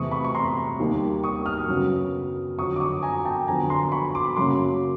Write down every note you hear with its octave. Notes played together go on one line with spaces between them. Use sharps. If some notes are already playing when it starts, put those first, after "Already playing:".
Already playing: E2 C3 E3 A3 C#6 D#6
B5 C#6
C#6
A#5 C6
D#2 D#3 G3 A#3
C#6 D#6
D#6 F6
F#2 C#3 F#3 B3
F2 D3 F#3 C#6 D#6
D6
C#6 D#6
G#5 A#5
G5 A5
F2 D3 F#3 B3 G#5 A#5
A#5 C6
B5 C#6
C6 D6
F#2 C#3 F#3 A#3 C6 D6